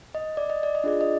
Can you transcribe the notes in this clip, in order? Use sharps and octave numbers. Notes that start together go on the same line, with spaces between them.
D#5
D5
D#5
D5
D#5
D4 F4 G#4 D5
D#5